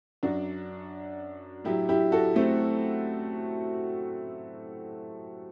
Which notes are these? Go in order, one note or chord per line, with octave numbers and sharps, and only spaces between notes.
F#2 F#3 D4 F#4
A2 F#3 E4 G4
E4 G4
F#4 A4
A3 C4